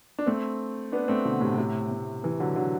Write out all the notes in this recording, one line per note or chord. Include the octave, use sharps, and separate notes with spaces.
D4
A3 C4
B3 D4
A3 C4
B2 D3
A2 C3
A2 C3
A2
C3 E3
D3 F#3
D3 F#3